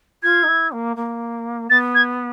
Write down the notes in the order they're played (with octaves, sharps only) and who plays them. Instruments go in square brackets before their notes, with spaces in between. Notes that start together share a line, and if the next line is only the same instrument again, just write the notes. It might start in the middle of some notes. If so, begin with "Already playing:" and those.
[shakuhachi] F4 [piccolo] G#6
[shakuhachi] D#4
E4
A#3
A#3
[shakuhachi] B3 [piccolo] A6
[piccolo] G#6